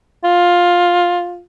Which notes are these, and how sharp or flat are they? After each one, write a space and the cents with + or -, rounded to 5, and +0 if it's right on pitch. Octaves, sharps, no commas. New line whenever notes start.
F4 +10